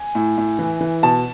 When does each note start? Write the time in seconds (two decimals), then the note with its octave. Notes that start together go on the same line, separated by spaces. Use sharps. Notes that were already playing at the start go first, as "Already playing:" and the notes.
Already playing: G#5
0.15 A2
0.38 A2
0.59 E3
0.81 E3
1.03 B2 A5